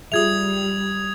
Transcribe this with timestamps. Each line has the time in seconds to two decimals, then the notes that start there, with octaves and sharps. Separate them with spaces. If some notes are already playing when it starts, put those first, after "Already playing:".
0.12 G3 F4 G#4 E5 D#6 G#6 F7